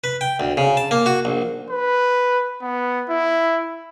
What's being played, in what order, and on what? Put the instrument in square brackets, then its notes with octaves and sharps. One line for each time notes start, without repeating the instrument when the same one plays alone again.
[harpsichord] B4
G5
D2
C#3
A5
A#3
F#4
A#1
[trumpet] B4
B3
E4